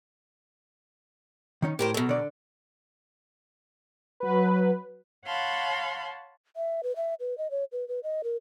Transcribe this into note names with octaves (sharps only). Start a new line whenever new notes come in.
D#3 C#4 D#4
A2 G4 A#4 C5
B2 F#3 A4
D3 D5
F#3 B4
C#5 F5 F#5 A5 B5 C6
E5
B4
E5
B4
D#5
C#5
B4
B4
D#5
A#4